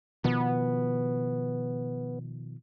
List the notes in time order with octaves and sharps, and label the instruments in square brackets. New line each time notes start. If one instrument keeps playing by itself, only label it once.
[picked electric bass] B2 D#3 F3 [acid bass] B3